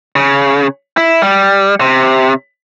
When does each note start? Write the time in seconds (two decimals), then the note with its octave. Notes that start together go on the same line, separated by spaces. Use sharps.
0.16 C#3
0.97 E4
1.22 G3
1.81 C3